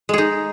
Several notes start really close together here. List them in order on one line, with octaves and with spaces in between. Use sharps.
G#3 G#4 D#4